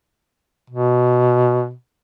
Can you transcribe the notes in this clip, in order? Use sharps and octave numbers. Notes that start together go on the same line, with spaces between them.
B2